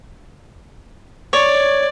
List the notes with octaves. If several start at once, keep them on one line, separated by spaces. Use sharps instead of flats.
C#5 D5